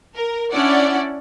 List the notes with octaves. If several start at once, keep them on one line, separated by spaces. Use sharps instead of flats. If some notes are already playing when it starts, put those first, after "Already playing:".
A#4
C#4 D4 E4 D5 F#5